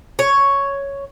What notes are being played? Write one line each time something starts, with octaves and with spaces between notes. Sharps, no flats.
C#5